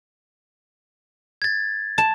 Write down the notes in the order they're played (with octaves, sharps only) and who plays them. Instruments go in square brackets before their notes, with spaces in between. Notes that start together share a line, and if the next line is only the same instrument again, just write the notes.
[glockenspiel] G#6 A6
[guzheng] A5